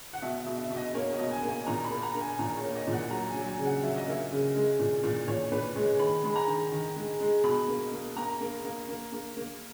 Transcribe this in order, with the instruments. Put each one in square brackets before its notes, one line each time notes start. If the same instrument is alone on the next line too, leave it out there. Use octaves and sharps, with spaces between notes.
[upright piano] F#5
B2 E5
E5
B2
E5
B2
D#5
A#3 C#5
D#5
B2
G#5
A#3
G#5
A#2 A#5
B5
A#3
A#5
A#3
G#5
A#2 A#5
C#5
A#3
D#5
A#2
F#5
F#3 A#5
G#5
F#3
G#5
C#3
F#5
F#3 E5
D#5
A#3 E5
C#3
G#3
A#2
A#2
A#2 C#5
A#2 B4
G#3 C#5
D#3 B5
G#3 B5
A#5
D#3
D#3
G#3
G#3
B2 B5
A#3
A#3
A#3 A#5
A#3
A#3
A#3
A#3
A#3